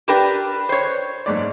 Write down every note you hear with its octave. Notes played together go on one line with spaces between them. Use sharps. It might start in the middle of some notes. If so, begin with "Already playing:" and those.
D4 G4 A#4 B4 G5 E7
C5 C#5
F#1 G#2 D5